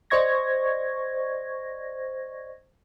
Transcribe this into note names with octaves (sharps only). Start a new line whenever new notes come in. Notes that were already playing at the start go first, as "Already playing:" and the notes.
C5 D5 D#5 C#6 G#6 A#6